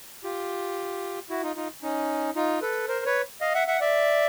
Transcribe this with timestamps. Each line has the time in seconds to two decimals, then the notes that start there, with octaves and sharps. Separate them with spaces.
0.24 F4 G4
1.30 E4 F#4
1.43 D#4 F4
1.56 D#4 F4
1.83 C#4 D#4
2.36 D#4 F4
2.62 A4 B4
2.88 A#4 C5
3.06 B4 C#5
3.41 D#5 F5
3.54 E5 F#5
3.68 E5 F#5
3.81 D5 E5